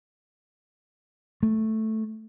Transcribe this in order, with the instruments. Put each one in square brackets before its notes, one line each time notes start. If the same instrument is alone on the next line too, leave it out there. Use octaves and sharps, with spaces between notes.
[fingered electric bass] A3